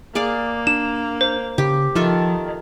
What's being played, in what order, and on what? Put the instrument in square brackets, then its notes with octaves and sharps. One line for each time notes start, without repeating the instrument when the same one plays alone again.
[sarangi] A#3 [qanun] G#4 D5 F5
[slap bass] D4 [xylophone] E7
[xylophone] C5
[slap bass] C#3 [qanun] G4
[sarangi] D#3 [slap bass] F3 [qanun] F4 A4 E5